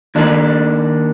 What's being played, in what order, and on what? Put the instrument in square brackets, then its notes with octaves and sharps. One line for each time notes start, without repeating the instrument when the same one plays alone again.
[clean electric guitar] D#2 D#3 D4